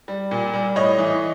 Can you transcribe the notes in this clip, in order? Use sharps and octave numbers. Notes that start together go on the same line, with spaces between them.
G3
A#2
G3
A2 C#5 D#5
E3